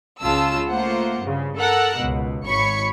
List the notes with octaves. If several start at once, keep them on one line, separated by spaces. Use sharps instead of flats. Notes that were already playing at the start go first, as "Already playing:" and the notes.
C#2 C#3 F4 A5 E6
A3 A#3 F4 C5 F#5
G2 C#3
A4 A#4 F#5 E6
C#2 B2
G#1 C#5 B5 C#6 C#7